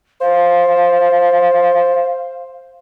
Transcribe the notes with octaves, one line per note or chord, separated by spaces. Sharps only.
C5 F5